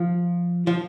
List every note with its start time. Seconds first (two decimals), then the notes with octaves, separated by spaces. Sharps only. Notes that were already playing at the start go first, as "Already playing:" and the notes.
Already playing: F3
0.67 F3